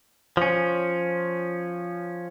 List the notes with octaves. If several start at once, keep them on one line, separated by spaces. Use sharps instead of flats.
F3 C#4